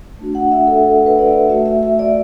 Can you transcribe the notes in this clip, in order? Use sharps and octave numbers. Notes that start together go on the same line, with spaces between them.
A3 D4 F#4
F#5
E5
A4
A4
B4
D5
E5
A3 F#4 E5
E5
E5
D5